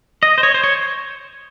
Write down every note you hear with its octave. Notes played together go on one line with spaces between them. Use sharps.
D#5
C5
C#5
C5
C#5